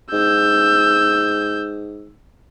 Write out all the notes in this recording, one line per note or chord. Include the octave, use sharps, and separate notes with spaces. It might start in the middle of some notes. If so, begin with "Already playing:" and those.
G#2 E6 G6